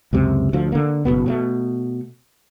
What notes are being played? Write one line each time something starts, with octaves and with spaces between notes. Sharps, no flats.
C#2 F#2 C3
D2 F3
D3 A#3
F#1 F2 B2 B3
B2 F#3 A3